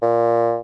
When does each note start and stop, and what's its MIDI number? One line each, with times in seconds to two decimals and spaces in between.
0.02 0.58 46